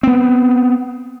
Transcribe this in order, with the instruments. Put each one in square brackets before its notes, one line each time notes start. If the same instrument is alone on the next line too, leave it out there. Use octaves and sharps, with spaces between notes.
[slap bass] B3 C4